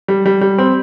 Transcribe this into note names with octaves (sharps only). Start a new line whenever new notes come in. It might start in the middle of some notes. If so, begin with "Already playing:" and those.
G3
G3
G3
C4